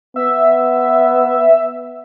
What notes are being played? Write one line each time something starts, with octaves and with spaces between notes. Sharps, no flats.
B3 E5